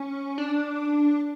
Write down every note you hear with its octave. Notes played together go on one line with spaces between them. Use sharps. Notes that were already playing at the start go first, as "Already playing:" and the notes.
Already playing: C#4
D4